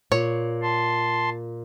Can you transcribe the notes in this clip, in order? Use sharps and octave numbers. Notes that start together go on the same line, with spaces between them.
A#2 C#5
A5 C6